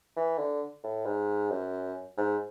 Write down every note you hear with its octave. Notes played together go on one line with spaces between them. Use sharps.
E3
D3
A2
G#2
F#2
G#2